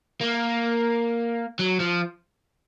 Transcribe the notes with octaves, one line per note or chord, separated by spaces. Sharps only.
A#3
F#3
F3